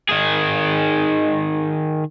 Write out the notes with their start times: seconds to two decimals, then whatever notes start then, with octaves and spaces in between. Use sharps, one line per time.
0.09 D#3 G#4